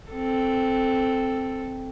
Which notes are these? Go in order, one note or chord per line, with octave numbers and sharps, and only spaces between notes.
C4 A4